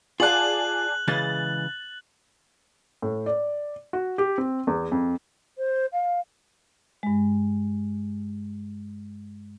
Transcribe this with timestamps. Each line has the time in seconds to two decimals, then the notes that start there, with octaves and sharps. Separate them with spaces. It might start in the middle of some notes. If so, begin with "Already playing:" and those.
0.20 F4 G#4 D5 F#5 A5 F#6 F#7
1.08 C#3 E3 G#3 A6
3.02 A2
3.26 D5
3.93 F#4
4.18 G4
4.38 C4
4.67 E2
4.92 F2
5.58 C5
5.92 F5
7.03 G2 G#3